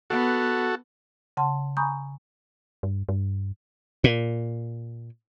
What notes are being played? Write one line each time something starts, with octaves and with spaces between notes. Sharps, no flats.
B3 F#4 A4
C#3 F#5 A5 C6
G#5 A#5 B5 C#6 D#6 G6
G2
G2
A#2